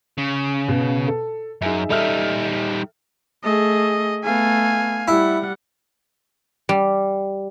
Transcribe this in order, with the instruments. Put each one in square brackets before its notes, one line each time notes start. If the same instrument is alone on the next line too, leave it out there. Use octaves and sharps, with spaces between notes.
[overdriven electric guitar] C#3
[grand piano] B2
A4
[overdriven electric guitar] F#2 [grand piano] D#4 G#4 E5
[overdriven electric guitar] G3 D#4 [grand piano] A4 E5 F6
[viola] A3 G#4 [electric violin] D#5
[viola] A3 B3 [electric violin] F5 G#5
[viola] G3 F#5 [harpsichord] E4
[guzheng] G3